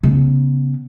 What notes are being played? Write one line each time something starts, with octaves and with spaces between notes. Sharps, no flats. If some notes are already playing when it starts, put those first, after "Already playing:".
C#3 B3